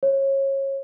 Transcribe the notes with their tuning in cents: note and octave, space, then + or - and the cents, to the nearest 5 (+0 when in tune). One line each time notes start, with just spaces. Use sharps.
C#5 -25